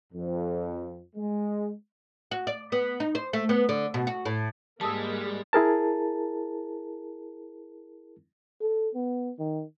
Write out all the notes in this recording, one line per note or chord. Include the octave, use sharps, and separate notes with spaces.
F2
G#3
F#4
D5
B3
D#4
C5
A3
B3
D3
B2
F#4
A2
G#2 G3 G#3 A#3 A5 D#6 E6
E4 G#4 A#4 A5
A4
B3
D#3